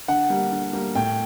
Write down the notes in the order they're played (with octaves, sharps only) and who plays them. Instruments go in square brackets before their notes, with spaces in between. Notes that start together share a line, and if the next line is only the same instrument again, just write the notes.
[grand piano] D3 F#5
G3 A#3
D3
G3 A#3
A2 G5